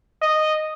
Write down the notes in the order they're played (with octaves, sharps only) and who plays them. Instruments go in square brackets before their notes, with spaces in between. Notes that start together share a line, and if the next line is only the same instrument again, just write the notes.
[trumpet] D#5